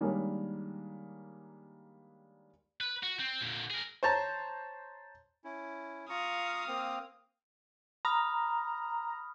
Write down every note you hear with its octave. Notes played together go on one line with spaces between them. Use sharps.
D#3 G3 G#3 A#3 D4 C#5
B4
F#4
C4
A#2 D3
G#4 A#4
C5 C#5 A5 A#5
C#4 E4
F4 F5 A#5 C#6 D#6
A#3 C4
A#5 B5 D#6 F6